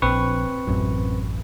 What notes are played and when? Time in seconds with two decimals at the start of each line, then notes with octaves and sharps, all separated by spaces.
0.02 A#1 C4 B4 C#6
0.67 A1 F#2